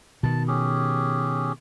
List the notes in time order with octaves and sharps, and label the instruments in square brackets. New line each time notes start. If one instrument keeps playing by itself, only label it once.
[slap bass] B2 D#3 [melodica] A5
[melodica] C#4 G4 G#4